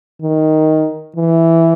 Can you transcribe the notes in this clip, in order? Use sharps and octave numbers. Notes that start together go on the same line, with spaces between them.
D#3
E3